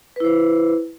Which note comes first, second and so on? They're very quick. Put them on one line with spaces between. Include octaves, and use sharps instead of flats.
B4 E4 C5